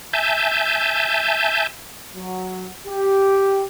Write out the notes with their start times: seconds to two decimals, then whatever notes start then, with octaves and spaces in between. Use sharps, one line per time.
0.13 E5 G#5 A5 G6
2.15 F#3
2.86 G4